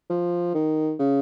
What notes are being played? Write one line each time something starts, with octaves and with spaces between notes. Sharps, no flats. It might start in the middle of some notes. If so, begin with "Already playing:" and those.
F3
D#3
C#3